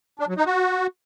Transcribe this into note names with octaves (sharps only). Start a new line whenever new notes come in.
D4
F#3
D#4
F#4